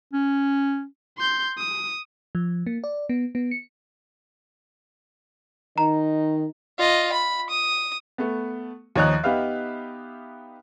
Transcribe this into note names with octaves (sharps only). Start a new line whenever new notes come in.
C#4
C6 G6
D#6
F3
A#3
D5
B3
B3
C#7
D#3 D#4 A#5
F4 D#5
B5
D#6
A3 B3
D#2 F3 C#5 D#5 A#5 F#6
B3 D#4 G4 B4 E5 F5